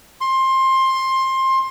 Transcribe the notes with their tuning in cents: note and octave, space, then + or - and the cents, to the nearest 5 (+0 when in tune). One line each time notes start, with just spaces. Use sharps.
C6 +20